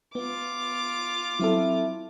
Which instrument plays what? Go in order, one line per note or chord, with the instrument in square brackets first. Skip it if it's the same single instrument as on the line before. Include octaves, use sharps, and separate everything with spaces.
[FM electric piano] B3 [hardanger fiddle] F4 D6
[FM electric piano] F#3 C4 A4 [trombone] E4